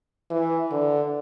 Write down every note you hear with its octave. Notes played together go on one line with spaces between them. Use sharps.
E3
D3